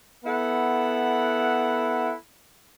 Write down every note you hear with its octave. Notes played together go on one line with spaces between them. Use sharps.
B3 E4 A4 F#5